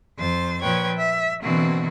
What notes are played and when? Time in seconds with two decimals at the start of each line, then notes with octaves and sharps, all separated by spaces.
0.17 F2 C5 A6
0.61 A#2 F3 B4 C#5 G5 G#6
0.96 E5
1.42 B2 D3 E3 A#3 C4 F#4